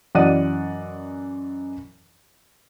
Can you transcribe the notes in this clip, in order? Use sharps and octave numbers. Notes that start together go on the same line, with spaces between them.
F#2 E3 D5 D#5 F#5 D#7